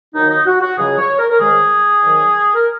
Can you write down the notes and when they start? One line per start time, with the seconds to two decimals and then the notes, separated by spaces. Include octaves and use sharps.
0.14 D#2 D#3 F#3 D#4
0.29 D#4
0.46 F#4
0.61 F#4
0.77 C#2 C#3 F#3 G#4
0.98 C#5
1.19 A#4
1.30 A#4
1.40 G#2 D#3 G#3 G#4
2.03 G#2 D#3 F#3
2.55 A#4